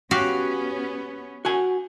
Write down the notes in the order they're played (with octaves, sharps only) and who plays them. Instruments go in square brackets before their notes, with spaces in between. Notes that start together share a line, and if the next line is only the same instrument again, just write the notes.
[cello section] B3 C#4 [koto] F#4 G4 F5
[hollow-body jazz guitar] F#4 F#5 G#5